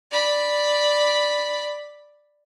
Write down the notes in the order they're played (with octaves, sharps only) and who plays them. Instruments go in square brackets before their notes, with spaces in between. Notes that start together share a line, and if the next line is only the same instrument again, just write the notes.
[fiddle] D5 B5